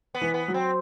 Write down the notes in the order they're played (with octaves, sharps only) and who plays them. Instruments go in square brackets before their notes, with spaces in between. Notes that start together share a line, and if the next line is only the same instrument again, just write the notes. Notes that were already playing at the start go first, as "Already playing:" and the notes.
[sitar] B3
[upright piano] E3
[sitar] B3
[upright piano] F#3
[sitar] C4